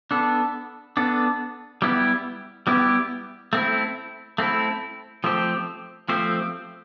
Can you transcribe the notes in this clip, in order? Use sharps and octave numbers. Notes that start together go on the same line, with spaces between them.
B3 D4 A4
B3 D4 A4
G3 B3 E4 G4
G3 B3 E4 G4
A3 C4 E4
A3 C4 E4
F3 A3 C4 G4 C5
F3 A3 C4 G4 C5